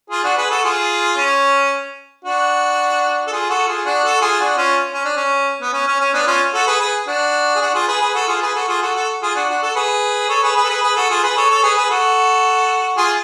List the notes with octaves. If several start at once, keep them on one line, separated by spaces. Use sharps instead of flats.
F4 G#4
D4 F#4
G#4 B4
F#4 A4
F4 G#4
C#4
D4 F#4
A4
F4 G#4
F#4 A4
F4 G#4
D4 F#4
F#4 A4
F4 G#4
D4 F#4
C#4 F4
C#4
D4
C#4
B3
C#4
C#4
C#4
B3 D4
C#4 F4
F#4 A4
G#4 B4
G#4 B4
D4 F#4
G#4
D4 F#4
F4 G#4
G#4 B4
G#4 B4
F#4 A4
F4 G#4
G#4 B4
F#4 A4
F4 G#4
F#4 A4
F#4 A4
F4 G#4
D4 F#4
D4 F#4
F#4 A4
G#4 B4
A4 C#5
G#4 B4
G#4 B4
A4
G#4 B4
G#4 B4
F#4 A4
F4 G#4
G#4 B4
A4 C#5
A4 C#5
G#4 B4
G#4 B4
F#4 A4
F4 G#4